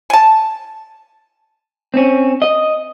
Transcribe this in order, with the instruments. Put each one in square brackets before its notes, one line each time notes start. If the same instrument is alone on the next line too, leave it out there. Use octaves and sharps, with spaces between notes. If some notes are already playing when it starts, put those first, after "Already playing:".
[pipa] G#5 A5
[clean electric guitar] C4 C#4
D#5